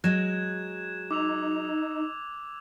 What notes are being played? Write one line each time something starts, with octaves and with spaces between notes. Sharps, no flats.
F#3 G#3 F#6 G#6 E7
D#4 D6 E6 F7